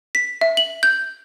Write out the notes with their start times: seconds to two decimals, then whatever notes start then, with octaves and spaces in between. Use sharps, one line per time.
0.15 B6
0.41 E5
0.57 F#7
0.83 G6